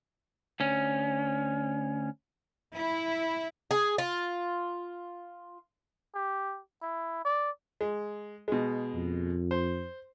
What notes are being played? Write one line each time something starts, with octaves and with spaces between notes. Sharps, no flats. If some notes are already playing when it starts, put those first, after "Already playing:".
D2 C#4
E4
G#4
F4
G4
E4
D5
G#3
B2 G#3
F2
C5